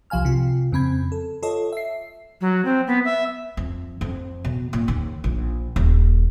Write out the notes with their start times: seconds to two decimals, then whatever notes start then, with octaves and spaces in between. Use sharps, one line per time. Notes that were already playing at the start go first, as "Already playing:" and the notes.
0.10 C2 F3 F5 G#5 F6
0.25 C3 F4
0.72 F2 C#3 C4 B5 G#6
1.12 A4
1.43 F4 A4 C#5 D#5
1.73 E5 C7
2.41 F#3
2.65 C4
2.87 B3
3.05 E5
3.57 F2
4.01 F2
4.45 B2
4.73 A#2
4.88 D#2
5.24 A#1
5.76 D#1